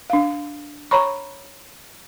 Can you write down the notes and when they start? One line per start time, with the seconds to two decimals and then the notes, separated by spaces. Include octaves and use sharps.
0.10 D4 F5
0.91 C#5 A#5 B5 C#6